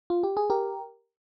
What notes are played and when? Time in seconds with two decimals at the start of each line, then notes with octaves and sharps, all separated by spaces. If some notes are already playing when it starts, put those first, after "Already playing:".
0.10 F4
0.23 G4
0.37 G#4
0.50 G4 A#4